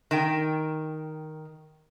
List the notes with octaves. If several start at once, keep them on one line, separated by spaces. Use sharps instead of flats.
D#3 G5